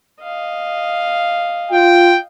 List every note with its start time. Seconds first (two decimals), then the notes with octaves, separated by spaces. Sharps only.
0.22 D#5 F5
1.72 F4 G5